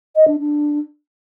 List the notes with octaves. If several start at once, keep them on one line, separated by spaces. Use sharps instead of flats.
D#5
D4
D4